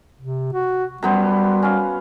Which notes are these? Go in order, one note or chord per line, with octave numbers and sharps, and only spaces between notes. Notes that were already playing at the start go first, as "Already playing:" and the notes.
C3
F#4
F#2 G3 B3 C5
C#4 F5